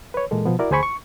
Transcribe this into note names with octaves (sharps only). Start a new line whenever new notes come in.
B4 C#5
A#2 E3 G#3 A#3 A4
B2 F3 B3
E4 F#4 A#4 D5
D2 G#4 C5 G#5 B5 C#6
C#6